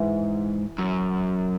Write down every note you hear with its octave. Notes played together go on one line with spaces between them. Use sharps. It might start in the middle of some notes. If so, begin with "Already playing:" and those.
Already playing: G#2 E3
F#2